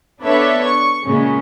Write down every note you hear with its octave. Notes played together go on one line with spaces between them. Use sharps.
B3 D4 A4 B4 C#5 E5
C#6
A#2 C#3 G#3 C#4